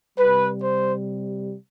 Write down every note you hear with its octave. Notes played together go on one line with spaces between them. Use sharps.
C3 G3 B4
C5